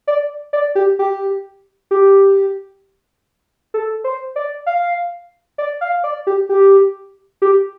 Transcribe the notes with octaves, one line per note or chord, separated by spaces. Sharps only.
D5
D5
G4
G4
G4
A4
C5
D5
F5
D5
F5
D5
G4
G4
G4